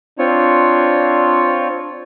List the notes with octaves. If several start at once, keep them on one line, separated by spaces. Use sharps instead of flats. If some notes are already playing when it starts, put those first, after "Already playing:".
C4 D4 F4 C#5